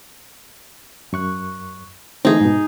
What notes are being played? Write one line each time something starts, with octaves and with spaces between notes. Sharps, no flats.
F#2 C#6 F#6
E3 A3 C4 D#4 G#4
G#2 B2